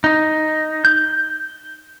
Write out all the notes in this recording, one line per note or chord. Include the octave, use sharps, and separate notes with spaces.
D#4
G6